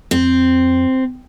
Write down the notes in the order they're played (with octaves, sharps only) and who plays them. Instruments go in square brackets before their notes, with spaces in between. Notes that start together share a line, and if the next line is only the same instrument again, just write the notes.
[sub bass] F2 [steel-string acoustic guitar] C4